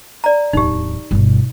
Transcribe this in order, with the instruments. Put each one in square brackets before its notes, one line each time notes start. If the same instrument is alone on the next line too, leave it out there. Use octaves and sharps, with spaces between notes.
[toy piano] D5 A#5
[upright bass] D1 E2 [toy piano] D#4 G4
[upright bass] G1 B2